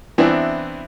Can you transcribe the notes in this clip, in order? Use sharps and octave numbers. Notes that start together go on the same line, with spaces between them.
E3 B3 C4 D4 E4